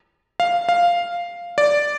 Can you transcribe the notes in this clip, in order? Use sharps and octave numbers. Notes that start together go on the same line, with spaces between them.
F5
F5
D5